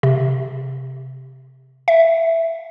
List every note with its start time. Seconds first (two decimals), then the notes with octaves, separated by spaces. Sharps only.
0.03 C3
1.88 E5